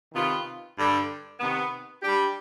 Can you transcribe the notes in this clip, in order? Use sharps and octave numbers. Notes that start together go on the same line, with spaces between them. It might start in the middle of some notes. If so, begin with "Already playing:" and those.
C3 D#3 B3 F4
G2 D3 G3
C3 D#3 B3
G3 D4 G4